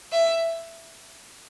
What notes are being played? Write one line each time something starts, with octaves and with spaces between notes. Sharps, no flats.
E5